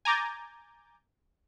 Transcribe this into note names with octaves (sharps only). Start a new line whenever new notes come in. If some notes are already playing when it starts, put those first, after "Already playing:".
G#5 A#5 D6 G6 A6